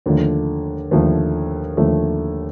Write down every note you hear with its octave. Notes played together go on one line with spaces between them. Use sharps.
D#2 D3 F3 A3
D#2 D3 F3 A3
D#2 D3 F3 A3